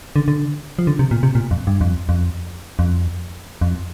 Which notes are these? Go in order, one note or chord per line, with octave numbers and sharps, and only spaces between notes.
D3
D3
F3
D3
C3
A#2
C3
A#2
F2
G2
F2
F2
F2
F2